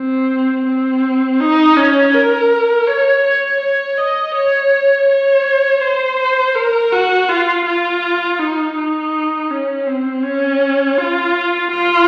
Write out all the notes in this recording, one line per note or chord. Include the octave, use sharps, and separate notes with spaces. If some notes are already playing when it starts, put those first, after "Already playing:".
Already playing: C4
C4
D#4
C#4
A#4
C#5
C#5
C#5
D#5
C#5
C#5
C5
A#4
F#4
F4
F4
D#4
D#4
C#4
C4
C#4
F4
F4